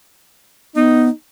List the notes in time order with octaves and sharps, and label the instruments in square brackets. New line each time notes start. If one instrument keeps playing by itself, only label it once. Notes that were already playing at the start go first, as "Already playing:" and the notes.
[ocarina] B3 [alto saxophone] D#4